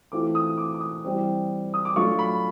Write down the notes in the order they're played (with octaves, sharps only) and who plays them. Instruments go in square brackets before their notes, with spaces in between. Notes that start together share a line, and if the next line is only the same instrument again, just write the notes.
[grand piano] E3 A3 C4 F4 D6
D#6
D6
D6
D#6
E3 G3 C4
D#6
D6
F#3 A3 D4 F4 C#6
B5